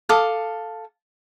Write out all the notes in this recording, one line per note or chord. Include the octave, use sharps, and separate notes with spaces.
A4 F5 D6 D#6